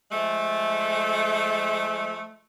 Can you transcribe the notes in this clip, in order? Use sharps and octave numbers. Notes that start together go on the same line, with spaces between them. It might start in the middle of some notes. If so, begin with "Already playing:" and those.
F3 G#3 A3